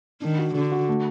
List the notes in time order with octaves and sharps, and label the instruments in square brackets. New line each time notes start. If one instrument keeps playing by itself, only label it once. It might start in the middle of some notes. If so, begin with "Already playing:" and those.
[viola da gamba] D#3 [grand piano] D4
[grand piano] F#4
[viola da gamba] D3 [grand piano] F#4
[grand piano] F#4
A3